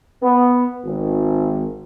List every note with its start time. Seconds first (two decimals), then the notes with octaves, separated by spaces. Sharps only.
0.23 B3
0.84 G#1